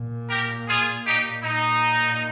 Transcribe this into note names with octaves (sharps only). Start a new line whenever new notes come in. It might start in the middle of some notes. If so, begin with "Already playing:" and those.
Already playing: A#2
G4 A#4
F4 G#4
D#4 G4
A#2 D#4